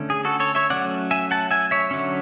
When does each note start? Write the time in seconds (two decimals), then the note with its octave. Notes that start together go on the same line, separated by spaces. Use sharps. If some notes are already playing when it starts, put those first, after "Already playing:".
Already playing: D3 A3 C#4
0.10 G#4
0.25 F#4 A4
0.40 A4 C#5
0.55 C#5 E5
0.70 F#3 A3 C#4 D5 F#5
1.11 E5 G#5
1.31 F#5 A5
1.51 E5 G#5
1.71 C#5 E5
1.91 D3 F#3 C#4